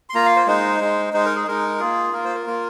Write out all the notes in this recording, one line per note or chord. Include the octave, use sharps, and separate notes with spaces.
C6
A#3 F4 A#5
F5
C5
G#3 D#4 C5
G#3 D#4
G#3 D#4 C5
A#4
G#4
G#3 D#4 A#4
A#3 F4 G#4
A#3 F4 A#4
C5
A#4
A#3 F4